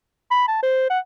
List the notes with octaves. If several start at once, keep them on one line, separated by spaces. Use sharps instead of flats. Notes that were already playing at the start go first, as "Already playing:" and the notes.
B5
A5
C5
F#5